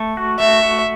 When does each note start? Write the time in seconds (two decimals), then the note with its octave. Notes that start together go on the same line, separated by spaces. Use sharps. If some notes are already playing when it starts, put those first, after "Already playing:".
Already playing: A3
0.17 F#4
0.39 A3 E5
0.63 F#4